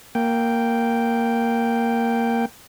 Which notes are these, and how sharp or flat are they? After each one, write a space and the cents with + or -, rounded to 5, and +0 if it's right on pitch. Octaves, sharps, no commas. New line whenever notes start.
A#3 -5 G5 +0